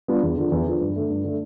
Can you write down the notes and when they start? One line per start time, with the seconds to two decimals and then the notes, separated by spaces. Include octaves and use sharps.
0.08 G3 B3 D4 F4
0.23 E2
0.37 D3 F3
0.52 E2
0.66 D3 F3
0.81 G2
0.96 D3 A3
1.10 G2
1.24 D3 A3